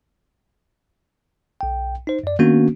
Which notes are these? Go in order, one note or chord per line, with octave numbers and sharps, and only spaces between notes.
B1 G5
D#4 C5
F#2 D5
D#3 A#3 B3 C#4 D4 F#4